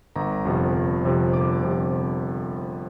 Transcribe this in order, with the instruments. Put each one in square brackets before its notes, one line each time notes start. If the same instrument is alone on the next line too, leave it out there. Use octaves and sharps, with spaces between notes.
[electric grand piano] G1 A#5
F2 C3 F3
G1
F2 C3 F3
G1 D6
C3 F3